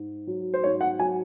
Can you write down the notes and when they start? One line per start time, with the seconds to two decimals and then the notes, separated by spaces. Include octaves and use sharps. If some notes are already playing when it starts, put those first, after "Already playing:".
Already playing: G#2
0.27 F#3
0.54 C5
0.64 G#2 C#5
0.81 F#5
0.99 F#3 G#5